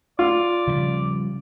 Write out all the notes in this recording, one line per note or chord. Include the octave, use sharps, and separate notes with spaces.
F4 D5
C#3 F3 G3